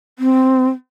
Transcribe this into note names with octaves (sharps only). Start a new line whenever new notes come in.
C4